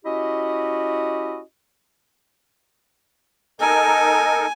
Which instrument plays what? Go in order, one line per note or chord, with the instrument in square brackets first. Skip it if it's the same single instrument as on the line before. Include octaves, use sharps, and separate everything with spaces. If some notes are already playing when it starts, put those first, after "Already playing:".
[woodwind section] C#4 E4 F#4 G4 D#5
[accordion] D#4 A4 A#4 [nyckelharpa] G#5